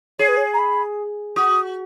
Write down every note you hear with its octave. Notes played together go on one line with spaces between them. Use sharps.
G#4 C#5
B4
C#5
A#5
B5
F#4 D#6